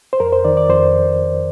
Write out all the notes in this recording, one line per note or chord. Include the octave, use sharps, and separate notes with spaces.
C5
F2 A#4
C5
D#3 D5
D5
F2 C5